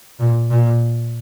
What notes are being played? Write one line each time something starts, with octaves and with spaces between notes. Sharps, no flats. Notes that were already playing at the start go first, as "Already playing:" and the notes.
A#2
A#2